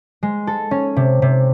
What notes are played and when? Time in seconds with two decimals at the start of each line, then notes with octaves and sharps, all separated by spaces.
0.23 G#3
0.47 A4
0.71 C#4
0.96 C3
1.22 C3